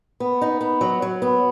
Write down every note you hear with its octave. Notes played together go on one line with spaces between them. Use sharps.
B3
D#4
B3
F#3
F#3
B3